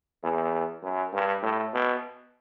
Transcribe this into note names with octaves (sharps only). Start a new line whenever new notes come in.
E2
F#2
G2
A2
B2